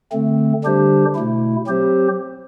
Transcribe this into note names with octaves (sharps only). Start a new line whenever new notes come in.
D3 A3 C4
D3 G3 D4 G4 C5
B2 A3 E4
F#3 C4 G4 C5